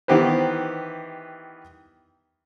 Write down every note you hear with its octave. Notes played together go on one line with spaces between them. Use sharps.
D#3 E3 B3 G4 B4 C5